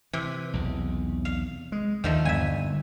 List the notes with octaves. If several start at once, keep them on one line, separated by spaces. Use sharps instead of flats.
C3 E3
B1 E2
F5
G#3
D#2 D#3 F3 A3
G1 E5 G#5